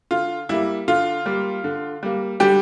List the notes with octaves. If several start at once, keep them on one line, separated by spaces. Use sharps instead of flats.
D3 F4
G3 A#3 E4
D3 F4
G3 A#3
D3
G3 A#3
D3 G3 G4